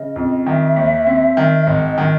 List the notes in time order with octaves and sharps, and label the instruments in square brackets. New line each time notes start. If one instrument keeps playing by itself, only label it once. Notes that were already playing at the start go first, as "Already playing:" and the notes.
Already playing: [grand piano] C#3 [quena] D#5
[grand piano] F2
[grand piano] D#3 [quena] E5
[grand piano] D#2
C4
D#3
[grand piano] G#1 [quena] D#5
[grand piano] D#3